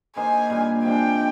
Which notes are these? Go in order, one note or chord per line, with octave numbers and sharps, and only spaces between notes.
A#3 D#4 G#4 C5 G#5
A#2 G3 D4
C3 F3 G#3 D4 G5